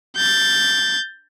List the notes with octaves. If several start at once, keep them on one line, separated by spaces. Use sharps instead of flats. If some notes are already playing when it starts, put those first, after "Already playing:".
G6 A6